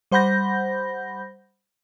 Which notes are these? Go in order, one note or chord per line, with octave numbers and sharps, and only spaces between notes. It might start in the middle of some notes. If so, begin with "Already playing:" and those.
G3 C5 F#5 B5 G6 A#6